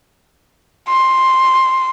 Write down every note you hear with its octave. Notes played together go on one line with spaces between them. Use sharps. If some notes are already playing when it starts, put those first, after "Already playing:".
C6